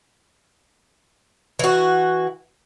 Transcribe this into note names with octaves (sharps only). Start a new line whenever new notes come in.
E3 F#4